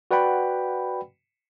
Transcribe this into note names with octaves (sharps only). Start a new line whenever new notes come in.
F#4 B4 D5 F#5 G5 B5